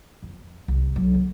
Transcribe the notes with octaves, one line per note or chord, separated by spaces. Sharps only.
F2
C2
F#3
D3